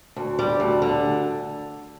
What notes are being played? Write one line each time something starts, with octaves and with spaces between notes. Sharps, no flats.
D2
G3
D2
D3